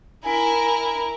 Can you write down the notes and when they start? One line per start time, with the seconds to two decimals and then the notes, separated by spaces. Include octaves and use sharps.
0.25 E4 A#4 G#5